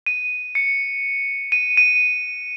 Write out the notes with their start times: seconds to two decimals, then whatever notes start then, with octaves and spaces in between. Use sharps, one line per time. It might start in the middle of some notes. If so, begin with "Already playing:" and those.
0.06 D#7
0.55 C#7
1.52 D#7
1.77 D#7